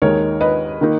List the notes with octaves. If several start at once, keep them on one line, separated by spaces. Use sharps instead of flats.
D#2 D#3 G#3 D#4 A#4 C#5
B4 D#5
D#3 A#3 D#4